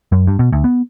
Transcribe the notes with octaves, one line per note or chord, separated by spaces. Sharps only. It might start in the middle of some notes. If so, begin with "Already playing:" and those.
F#2
G2
B2
D2
B3